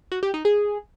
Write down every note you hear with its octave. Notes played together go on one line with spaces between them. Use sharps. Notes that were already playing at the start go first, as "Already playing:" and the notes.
F#4
G4
D#4
G#4